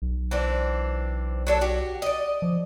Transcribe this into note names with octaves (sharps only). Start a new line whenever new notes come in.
B1
E3 C4 D4
F#3 D4 A4
F#4 G4
D5 D#5
F3